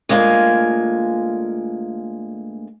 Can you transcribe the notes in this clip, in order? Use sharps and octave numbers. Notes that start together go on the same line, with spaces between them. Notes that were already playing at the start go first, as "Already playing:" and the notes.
D2 G#3 A#3 F4 G#5